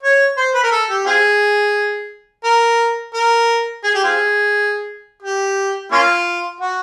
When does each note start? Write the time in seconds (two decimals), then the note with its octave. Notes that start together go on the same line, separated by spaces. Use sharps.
0.03 C#5
0.37 C5
0.54 B4
0.63 A#4
0.72 A4
0.89 G4
1.06 C4 F4 G#4
2.44 A#4
3.14 A#4
3.84 G#4
3.94 G4
4.04 C4 F4 G#4
5.22 G4
5.92 A#3 C#4 F4
6.60 F#4